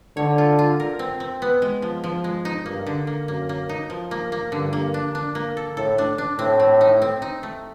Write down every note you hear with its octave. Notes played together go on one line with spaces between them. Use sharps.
D3 C#5
F4
F4
A#4
C4
C4
B3
G#3
F3
F3
G#3
D#4
G2 A#3
D3
A#3
F#2 A#3
A#3
D#4
F3
A#3
A#3
G2 D3
A#3
D4
D4
A#3
A4
A2 A4
D4
D4
A2 C4
C4
D#4
C4
D#4
A3